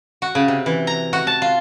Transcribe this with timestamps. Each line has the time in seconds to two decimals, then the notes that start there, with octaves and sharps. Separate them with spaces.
0.22 F#4
0.35 C#3
0.48 C3
0.66 E3
0.87 A#5
1.13 F#4
1.27 A5
1.42 F4